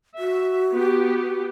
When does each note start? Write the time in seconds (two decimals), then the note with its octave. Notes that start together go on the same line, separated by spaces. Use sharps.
0.19 F#4 E5
0.73 B3 G4